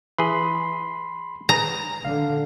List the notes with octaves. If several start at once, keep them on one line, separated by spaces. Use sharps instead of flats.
E3 G#4 B5 C6
G#4 B4 A#5
D3 F5